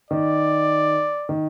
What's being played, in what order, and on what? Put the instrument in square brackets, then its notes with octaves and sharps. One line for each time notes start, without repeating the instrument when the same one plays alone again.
[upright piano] D#3 [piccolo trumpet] D5
[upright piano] D#3